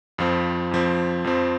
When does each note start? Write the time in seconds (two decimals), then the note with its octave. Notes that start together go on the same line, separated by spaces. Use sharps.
0.18 F2 F3 C4
0.71 F2 F3 C4
1.24 F2 F3 C4